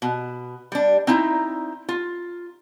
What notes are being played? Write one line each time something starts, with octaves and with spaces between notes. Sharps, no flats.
B2
G3 D4
C4 D#4 E4 A#5
F4